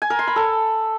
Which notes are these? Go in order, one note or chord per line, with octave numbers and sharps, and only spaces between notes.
G#5
A#4
C6
B5
A4